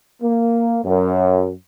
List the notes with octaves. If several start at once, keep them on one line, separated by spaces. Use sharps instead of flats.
A#3
F#2